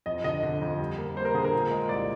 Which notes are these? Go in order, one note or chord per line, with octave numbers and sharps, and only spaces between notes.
F2 D#5
D3 D#5
D3
F2
G3
A#3
G3 C5
A#4
D3 G#4
A#4
A#2
G#3
C2 D5